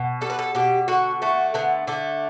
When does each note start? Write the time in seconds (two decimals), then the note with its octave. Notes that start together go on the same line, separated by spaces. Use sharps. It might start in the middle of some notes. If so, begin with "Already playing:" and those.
Already playing: B2
0.21 G3 A4
0.30 B4
0.39 A4
0.55 B2 G4
0.88 D3 F#4
1.22 A3 F#4
1.54 D3 B3
1.87 D3 A3